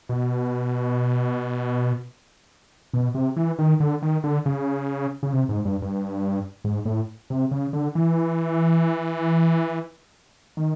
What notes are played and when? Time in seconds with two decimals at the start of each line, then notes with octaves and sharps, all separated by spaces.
0.09 B2
2.93 B2
3.15 C3
3.36 E3
3.59 D#3
3.80 D3
4.02 D#3
4.24 D3
4.46 C#3
5.23 C#3
5.33 C3
5.49 G#2
5.65 G2
5.82 G2
6.64 G#2
6.85 A2
7.30 C3
7.51 C#3
7.73 D3
7.95 E3
10.57 D#3